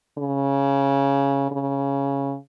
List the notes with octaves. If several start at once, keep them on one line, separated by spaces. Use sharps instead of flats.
C#3
C#3